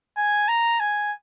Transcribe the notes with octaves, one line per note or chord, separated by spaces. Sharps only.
G#5
A#5
G#5